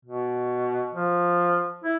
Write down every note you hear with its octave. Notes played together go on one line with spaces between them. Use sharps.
B2
F3
E4